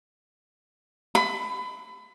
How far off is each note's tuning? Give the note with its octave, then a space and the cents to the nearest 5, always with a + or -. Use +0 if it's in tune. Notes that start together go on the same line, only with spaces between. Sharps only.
B5 +25